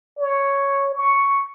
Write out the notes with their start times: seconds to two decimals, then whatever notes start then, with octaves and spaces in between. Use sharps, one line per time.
0.19 C#5
0.95 C#6